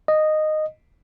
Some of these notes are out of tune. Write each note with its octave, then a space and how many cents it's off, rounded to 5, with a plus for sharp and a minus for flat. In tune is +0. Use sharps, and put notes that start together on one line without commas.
D#5 -10